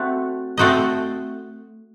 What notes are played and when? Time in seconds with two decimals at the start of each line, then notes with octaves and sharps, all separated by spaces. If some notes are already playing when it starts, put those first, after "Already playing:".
Already playing: A3 C4 F#4
0.57 A3 C4 F#4 C5 D#5